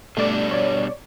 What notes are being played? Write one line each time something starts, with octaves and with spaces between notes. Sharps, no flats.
B2 G3 A3 D4 D5
C#5 D5